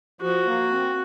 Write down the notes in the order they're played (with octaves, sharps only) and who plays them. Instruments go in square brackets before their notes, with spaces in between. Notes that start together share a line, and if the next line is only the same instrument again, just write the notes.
[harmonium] F3 [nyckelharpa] F#4
[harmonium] A#3
C4